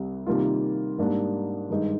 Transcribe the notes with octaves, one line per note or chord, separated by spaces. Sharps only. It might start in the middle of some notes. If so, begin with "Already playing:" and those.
Already playing: C2 C3 G3
C3 D#3 G3 A#3 F4
G#2 G3 A#3 D4
G2 D#3 G#3 D#4